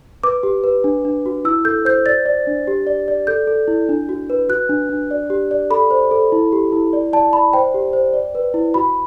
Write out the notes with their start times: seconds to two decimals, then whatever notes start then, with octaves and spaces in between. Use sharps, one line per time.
0.23 B4 D6
0.43 G4
0.64 B4
0.84 D4
1.05 D4
1.26 F#4
1.45 E4 E6
1.65 A4 G6
1.85 C5 G6
2.06 D5 A6
2.26 D5
2.47 D4
2.67 G4
2.87 D5
3.08 D5
3.27 A4 G6
3.47 A4
3.68 E4
3.89 D4
4.09 F#4
4.30 B4
4.49 F#4 F#6
4.69 D4
4.89 D4
5.11 D5
5.30 G4
5.51 D5
5.70 A4 B5
5.91 C5
6.11 A4
6.32 E4
6.52 G4
6.72 E4
6.93 D5
7.13 D5 A5
7.33 D5 B5
7.53 C5 G5
7.74 G4
7.93 C5
8.14 D5
8.35 B4
8.54 E4
8.74 F#4 B5